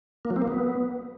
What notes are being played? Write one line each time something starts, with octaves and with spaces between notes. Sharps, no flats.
A#3
F#3
C4
A#3
B3